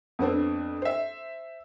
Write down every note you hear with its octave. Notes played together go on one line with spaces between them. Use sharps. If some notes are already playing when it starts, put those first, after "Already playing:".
F2 B3 C4 D4
C5 E5